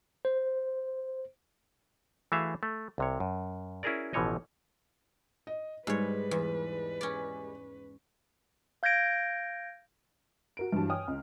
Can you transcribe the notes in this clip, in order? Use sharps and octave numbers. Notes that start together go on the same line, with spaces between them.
C5
E3 A3 F#4 G#4 E5 F5
A3
C2 C3 C#5
F#2
C#4 E4 F#4 G#4 A#4 D5
A1 B2 E3 F3 C#5 D#5
D#5
G#2 G3 G#3 B4 C#5
E2
C#4 D5
F5 G6 G#6 A#6 D7
F#4 A#4 D7
G2 E3 F#3 A5
C#5 G5 G#5 D#6 F6
C#2